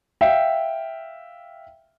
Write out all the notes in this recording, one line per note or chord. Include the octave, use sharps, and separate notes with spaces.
E5 F5 G5